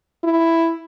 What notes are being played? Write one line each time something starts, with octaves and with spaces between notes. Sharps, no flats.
E4